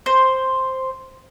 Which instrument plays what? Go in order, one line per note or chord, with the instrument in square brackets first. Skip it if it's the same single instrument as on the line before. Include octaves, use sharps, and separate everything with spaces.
[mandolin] C5